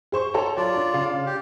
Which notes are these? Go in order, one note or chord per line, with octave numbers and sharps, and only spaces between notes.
G#4 C5 C#6
A4 C#5 A#5
F#3 F4 D5
D4
C#3 F5
G4